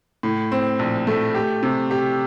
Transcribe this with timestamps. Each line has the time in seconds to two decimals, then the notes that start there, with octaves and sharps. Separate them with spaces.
0.23 A2
0.52 C4
0.79 A#1
1.07 A3
1.35 G4
1.63 C3
1.91 G4